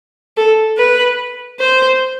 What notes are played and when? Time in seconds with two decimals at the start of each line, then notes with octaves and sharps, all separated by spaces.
0.37 A4
0.78 B4
1.60 C5